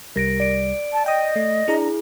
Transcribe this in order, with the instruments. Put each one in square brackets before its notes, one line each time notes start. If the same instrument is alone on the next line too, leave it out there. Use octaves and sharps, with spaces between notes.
[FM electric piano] C2 G3 [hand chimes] A#4 A#6 D7
[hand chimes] D5 D7
[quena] A5
[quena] D#5 [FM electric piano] G5 D#6
[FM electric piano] A3
[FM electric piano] D4 A#5 [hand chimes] E4 G#4